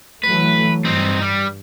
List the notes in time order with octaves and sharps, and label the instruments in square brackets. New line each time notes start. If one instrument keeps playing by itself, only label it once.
[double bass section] E3 F#3 A3 [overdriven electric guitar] B4
[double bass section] G2 [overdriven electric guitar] C4 D#4
[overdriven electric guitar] G3